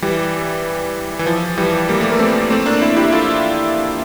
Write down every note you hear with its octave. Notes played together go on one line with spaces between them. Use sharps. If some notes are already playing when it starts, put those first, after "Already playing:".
E3 G3
E3
F3
E3 G3
G3 A#3
A3
A#3
A3 C4
A3 C4
A#3 D4
C4 E4
E4 G4
F4 A4